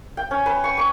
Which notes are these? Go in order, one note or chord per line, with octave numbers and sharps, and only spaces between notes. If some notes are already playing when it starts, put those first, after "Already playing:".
G5
C#4
B4
C#6
C#6